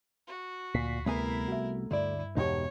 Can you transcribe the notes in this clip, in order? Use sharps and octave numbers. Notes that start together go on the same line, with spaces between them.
F#4
D2 A#2 B6 C7
C2 A3 B3 E4 A#4 G#5
F#4 E5
D2 G2 E4 D5
E2 B2 G#3 D#4 G4 C#5